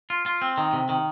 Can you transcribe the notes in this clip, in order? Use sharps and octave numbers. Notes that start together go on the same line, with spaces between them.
F4
F4
C4
D#3
C3
D#3